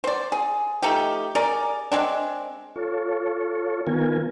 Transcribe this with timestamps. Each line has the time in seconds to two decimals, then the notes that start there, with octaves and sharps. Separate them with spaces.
0.04 C5 D5
0.32 G#4
0.82 F3 A3 D#4 G4
1.35 G#4 A#4 D5
1.92 G#3 C4 D4
2.76 F4 A4 C#5
3.87 D#3 B3 F4 A#4 G#5